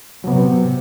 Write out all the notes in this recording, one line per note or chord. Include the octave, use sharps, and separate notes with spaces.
C3 F#3 B3